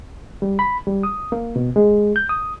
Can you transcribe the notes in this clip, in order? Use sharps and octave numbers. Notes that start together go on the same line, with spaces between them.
G3
B5
G3
D#6
A#3
B2
G#3
G6
D#6